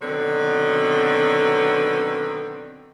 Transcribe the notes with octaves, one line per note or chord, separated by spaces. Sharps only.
B2 D3 D#3 F#3 C4